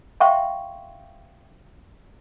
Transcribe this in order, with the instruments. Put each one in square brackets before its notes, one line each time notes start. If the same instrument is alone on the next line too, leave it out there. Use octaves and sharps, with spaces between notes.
[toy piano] E5 F5 G5 C6 C#6